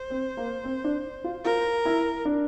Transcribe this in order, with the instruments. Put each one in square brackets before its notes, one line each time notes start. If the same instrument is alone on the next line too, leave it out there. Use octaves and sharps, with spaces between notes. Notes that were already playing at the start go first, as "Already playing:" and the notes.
Already playing: [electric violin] C5
[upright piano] C4
A#3
C4
D4
F4
[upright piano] F4 [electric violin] A#4
[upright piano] E4
D4